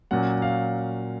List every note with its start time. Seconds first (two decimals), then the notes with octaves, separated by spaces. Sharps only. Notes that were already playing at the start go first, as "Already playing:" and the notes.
0.11 A#2 F#3 C#4 F#5
0.42 F5